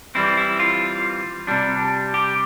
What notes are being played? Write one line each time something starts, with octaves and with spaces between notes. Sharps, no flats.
E3 G3 C4 E4
E4
F4
C3 G3 D4
G4